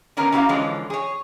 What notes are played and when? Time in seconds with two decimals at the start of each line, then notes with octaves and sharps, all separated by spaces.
0.17 D3 D#3 B3 C#4 A#4
0.32 C#4 E4 F#4 G4 F5 A#5
0.49 D3 E3 F3 G#3 C#4
0.90 G#4 C#5